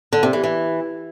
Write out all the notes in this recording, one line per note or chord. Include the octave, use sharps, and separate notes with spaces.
D3
C3
E3
E3